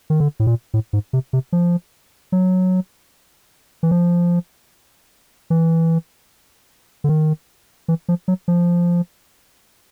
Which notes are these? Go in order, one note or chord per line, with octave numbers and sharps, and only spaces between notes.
D#3
D3
A2
A#2
A2
G#2
C3
C3
F3
F#3
E3
F3
E3
D3
D#3
E3
F3
F#3
F3